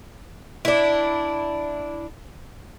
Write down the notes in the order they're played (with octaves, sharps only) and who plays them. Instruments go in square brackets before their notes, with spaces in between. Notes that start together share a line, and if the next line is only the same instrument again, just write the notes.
[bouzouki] D4 E4